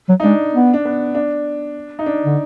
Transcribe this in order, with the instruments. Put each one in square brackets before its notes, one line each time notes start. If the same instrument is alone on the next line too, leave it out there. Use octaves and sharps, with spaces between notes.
[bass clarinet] F#3
[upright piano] D#4
[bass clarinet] G#3 [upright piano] D4
[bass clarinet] B3
[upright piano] D4
B3
D4
D#4
D4
[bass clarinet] D3